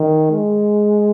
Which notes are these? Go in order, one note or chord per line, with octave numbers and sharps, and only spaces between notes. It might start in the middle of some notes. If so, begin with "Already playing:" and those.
Already playing: D#3
G#3